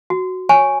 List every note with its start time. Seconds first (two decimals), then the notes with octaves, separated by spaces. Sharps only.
0.10 F#4
0.49 C#5 G#5 C#6